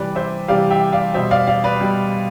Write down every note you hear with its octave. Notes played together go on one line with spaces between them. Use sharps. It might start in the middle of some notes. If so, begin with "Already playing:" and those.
Already playing: C3 E3 G3 B4 D5
C5 E5
C3 E3 G3 D5 F5
E5 G5
D5 F5
B2 G3 C5 E5
D5 F5
D5 F5
B4 D5
B2 G3